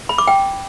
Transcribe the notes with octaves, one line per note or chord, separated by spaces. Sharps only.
B5
D6
G5